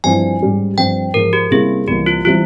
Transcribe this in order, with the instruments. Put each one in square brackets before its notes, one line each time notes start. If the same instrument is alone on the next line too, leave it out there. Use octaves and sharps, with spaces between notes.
[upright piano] G2 F3 C4 E4 [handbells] G#5
[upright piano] G#2 G3 C#4
[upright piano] G2 F3 C4 [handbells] G5
[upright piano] G#2 F3 G#3 [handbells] A#4
[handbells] G4
[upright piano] C3 G3 A#3 C#4 E4 [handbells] G#4
[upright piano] C2 C3 E3 A#3 [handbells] G4
[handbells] F4
[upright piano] E3 G3 C4 E4 [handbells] F4